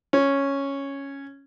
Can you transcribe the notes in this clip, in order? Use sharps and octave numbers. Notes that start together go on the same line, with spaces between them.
C#4